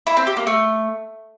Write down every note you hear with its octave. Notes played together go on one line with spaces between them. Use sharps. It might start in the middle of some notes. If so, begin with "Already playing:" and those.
E4
C4
G4
A#3
A3